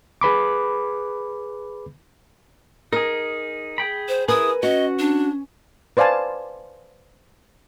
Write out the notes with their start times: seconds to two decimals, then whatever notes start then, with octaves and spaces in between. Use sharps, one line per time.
0.21 G#4 B4 B5 D6
2.93 D#4 G#4 A#4
3.78 G#4 G5 B5
4.08 C5
4.28 E4 G#4 A#4 B4 G#5 D#6
4.63 C#4 F#4 D#5
4.99 D4
5.97 B4 C5 D5 F5 G#5 A5